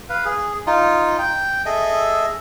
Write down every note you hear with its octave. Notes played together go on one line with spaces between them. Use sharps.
B4 F5
G#4
D#4 F4
G5
G#4 A4 D#5 E5